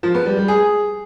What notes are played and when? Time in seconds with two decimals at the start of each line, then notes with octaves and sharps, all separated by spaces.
0.03 F3
0.14 B3
0.26 G3
0.37 G3
0.48 G#4